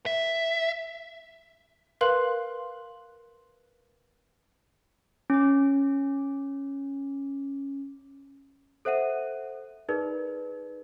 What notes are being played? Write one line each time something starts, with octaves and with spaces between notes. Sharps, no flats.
E5
A#4 B4 F5 C6 F#6 F#7
C#4 D6
A4 C5 E5 F#5 D#7
D#4 G#4 A#4 B4 D5